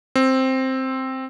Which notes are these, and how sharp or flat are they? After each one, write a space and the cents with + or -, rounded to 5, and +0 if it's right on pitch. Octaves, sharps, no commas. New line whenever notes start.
C4 +5